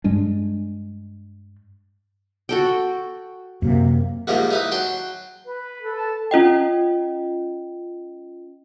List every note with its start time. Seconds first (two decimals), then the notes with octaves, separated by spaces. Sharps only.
0.04 G2 G3 G#3 D4
2.49 F#4 A4 G5
3.62 F#2 C3 A#3
4.27 G#2 C3 D#3 F3 G3 A#3
4.51 D#4 E4 B4
4.72 F#3 G5 A5 C6
5.46 B4
5.81 A4
5.96 A5
6.31 C#4 F4 D#5 G5